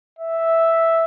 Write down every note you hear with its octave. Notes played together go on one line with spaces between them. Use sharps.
E5